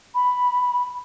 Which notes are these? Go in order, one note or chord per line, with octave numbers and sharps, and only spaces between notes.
B5